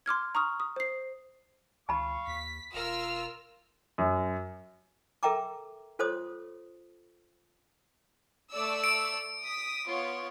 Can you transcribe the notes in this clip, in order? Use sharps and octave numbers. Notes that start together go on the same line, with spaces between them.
C6 D6 F6 G#6
A#5 C#6 D#6 F6
D#6
C5 C7
C#2 F5 A5 B5 C#6
D#2 B6
E1 F4 A#4 E6 F6
F#2
A4 A#4 E5 G5 A#5 D6
F4 A4 C5 C#5 C6 D#6
A3 D5 E6
D7
D#6 B6
B3 F4 C#5